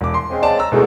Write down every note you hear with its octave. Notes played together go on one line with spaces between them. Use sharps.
E1 D6
C6
C#3 G#3 C4
D5 A5
A5 A#5 E6
E2 G#2 B2 G#3 A3